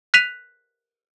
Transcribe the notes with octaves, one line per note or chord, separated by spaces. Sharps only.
F#6 B6 D#7 F7